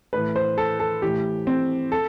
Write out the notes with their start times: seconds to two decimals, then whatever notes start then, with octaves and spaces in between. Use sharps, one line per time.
0.13 A2 E3 B4
0.36 C5
0.58 A4
0.80 A4
1.02 A2 E3 G4
1.47 C4
1.92 A4